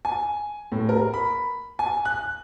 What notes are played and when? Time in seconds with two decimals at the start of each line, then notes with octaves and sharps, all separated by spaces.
0.05 G#5
0.72 A2
0.89 A#4
1.14 B5
1.79 G#5
2.05 F#6